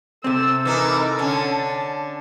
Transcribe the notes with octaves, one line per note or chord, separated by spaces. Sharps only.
C3 C4 A4 E6
E3 D#4 A#4
D3 C#4 A5